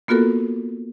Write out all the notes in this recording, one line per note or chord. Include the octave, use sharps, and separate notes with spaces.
A#3 B3 F4 F#4 A4 A#4